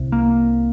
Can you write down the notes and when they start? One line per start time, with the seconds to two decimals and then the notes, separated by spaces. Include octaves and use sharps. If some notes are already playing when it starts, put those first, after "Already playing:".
Already playing: C2 C3
0.12 A#3